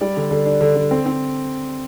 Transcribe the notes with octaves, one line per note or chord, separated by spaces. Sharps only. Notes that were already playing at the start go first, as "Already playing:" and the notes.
G3 D5
D3
D3
D4
D3
D3
C4
C4